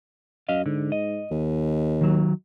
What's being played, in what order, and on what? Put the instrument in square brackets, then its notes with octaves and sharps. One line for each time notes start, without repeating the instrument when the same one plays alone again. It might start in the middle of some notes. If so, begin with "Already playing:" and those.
[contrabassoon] F#2 [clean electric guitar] D#5 F5
[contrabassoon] G#2 [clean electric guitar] D3
[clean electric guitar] D#5
[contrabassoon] D#2
[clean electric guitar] D#3 F#3